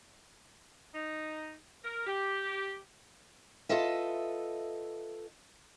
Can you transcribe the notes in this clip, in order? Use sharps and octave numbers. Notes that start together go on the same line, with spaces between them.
D#4
A#4
G4
F4 A4 B4 D#5 E5